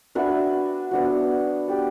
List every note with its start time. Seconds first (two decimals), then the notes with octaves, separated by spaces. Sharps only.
0.15 D4 F#4 B4 E5
0.91 B3 D4 F#4
1.68 D4 G4 B4